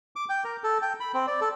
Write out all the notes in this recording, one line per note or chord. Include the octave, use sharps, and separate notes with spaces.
D6
G5
A#4
A4
G5
B5
C4
D5
A4